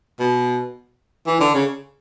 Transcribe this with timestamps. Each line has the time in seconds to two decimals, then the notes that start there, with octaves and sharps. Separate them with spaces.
0.20 B2
1.27 E3
1.40 D3
1.54 C#3